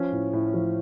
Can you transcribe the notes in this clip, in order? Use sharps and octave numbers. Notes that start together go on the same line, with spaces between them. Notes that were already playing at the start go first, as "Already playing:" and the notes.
Already playing: F3 C#4
A2
A2
F3